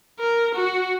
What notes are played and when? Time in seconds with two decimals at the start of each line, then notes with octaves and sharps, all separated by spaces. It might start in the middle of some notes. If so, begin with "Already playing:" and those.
0.19 A#4
0.55 F#4